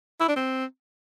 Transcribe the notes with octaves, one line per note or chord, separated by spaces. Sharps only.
E4
D4
C4